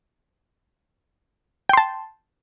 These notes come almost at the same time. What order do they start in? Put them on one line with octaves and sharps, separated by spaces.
G5 C6 A5